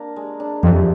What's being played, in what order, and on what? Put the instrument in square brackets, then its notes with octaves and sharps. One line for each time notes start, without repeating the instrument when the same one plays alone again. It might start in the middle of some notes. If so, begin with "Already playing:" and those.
Already playing: [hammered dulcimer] A#3 D4 A#4
G#3
D4
[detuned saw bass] F2 [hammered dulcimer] C3